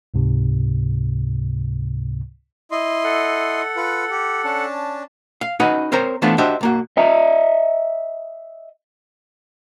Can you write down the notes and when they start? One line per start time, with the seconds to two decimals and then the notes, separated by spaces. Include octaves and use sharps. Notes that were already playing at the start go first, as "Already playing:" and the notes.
0.14 C#2 G#2 C3
2.71 E4 D#5 C6
3.04 A4 F#5
3.76 F4 B4
4.10 G4
4.44 C#4 D4 A5
5.41 F5
5.60 C#4 D#4 F#4 B4 D#5 F#5
5.92 C4 A#4 C5 C#5 A#5
6.22 E3 F3 A3 B3 D4 F4
6.38 D4 F#4 G4 C5 D#5 E5
6.61 B1 A#3 F#4
6.97 D#5 E5 A#5